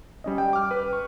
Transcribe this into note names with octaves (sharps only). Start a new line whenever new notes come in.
G3 C#4 D#5
G5
D6 F6
B4
C#6